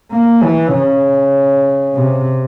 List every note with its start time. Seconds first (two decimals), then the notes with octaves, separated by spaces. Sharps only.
0.11 A#3
0.43 E3
0.73 C#3
1.95 C3